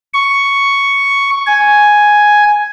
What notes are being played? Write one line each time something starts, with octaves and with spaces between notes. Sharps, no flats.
C#6
G#5